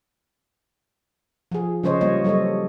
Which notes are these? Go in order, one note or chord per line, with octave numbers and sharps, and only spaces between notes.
F3 G#4
C#3 F3 G#3 C5 C#5 D#5
G3 A#3 C#5 D#5
F#3 G3 A4 C#5 D#5